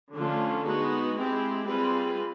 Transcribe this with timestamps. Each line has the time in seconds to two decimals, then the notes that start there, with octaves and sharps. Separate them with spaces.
0.14 D3 F3 A3 C#4 F4
0.64 G#3 B3 D#4 F#4
1.15 G#3 C4 E4 G4
1.66 G3 C4 F4 G#4 B4